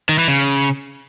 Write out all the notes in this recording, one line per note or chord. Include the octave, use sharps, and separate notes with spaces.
D#3
E3
C#3